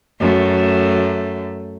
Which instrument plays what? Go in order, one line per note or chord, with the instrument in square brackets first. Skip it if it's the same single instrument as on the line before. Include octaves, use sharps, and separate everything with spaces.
[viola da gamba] F#2 A3